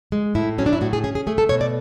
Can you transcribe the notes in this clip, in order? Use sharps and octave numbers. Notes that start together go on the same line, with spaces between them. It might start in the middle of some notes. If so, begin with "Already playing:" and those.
G#3
A2 E4
F#3 C#4
D4
E4
A2 F#4
G#4
C#4 G#4
G#4
A3 G#4
A4
B2 C#5
D5